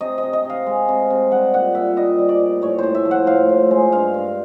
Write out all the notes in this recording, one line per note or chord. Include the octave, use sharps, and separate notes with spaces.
C3 D#5
D#5
C3
D#5
C3 F5
G#3
C3
C3
G3 F#5
A#2 F#5
A#2 E5
G3 D#5
G3
D5
A#2
A2 C#5
A2 C5
E5
F3
F#5
A2 F5
A2
G#3
G2 F5
G2